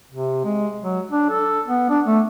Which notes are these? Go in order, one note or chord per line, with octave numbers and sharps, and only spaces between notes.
C3
G#3
F#3
D4
A4
B3
D4
A3